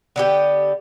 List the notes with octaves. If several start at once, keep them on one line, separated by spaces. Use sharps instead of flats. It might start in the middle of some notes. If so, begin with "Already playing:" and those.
D3 B3 G4